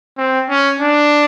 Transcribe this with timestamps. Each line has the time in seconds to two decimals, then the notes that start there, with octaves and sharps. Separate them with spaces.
0.18 C4
0.49 C#4
0.81 D4